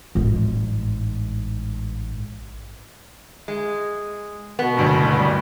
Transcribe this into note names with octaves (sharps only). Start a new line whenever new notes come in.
A1 G#2
G#3
B2 B3
F#1 D2 G2
G3